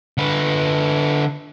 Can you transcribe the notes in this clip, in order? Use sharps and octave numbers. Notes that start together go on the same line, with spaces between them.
D3 B4